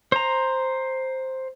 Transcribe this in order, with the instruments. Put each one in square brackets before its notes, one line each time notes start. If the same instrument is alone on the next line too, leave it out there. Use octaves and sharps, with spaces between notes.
[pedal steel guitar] C5 A#5